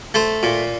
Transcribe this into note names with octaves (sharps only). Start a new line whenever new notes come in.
A3 C5
A#2